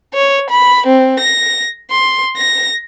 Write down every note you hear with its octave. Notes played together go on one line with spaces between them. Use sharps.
C#5
B5
C4
A#6
C6
A#6